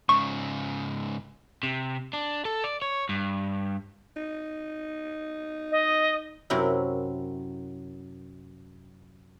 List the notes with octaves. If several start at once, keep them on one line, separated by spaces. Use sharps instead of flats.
G#2 C#3 C#6
C3
D4
A4
D5
C#5
G2
D#4
D#5
F#2 C3 F#3 C4 E4 A#4